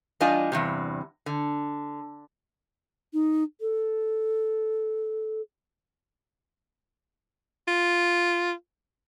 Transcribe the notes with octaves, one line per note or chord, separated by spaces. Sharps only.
E2 G3 D4 F4 D#5 G#5
E2 G2 C3
D3
D#4
A4
F4